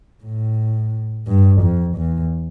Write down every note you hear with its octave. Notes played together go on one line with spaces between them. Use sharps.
A2
G2
F2
E2